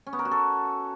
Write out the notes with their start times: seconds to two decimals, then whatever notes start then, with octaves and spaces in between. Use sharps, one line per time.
0.07 C#4
0.13 B3
0.19 A#4
0.25 F#4
0.31 A4